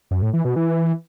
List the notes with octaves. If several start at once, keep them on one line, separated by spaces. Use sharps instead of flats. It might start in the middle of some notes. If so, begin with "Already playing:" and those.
F#2
A2
E3
B2
E3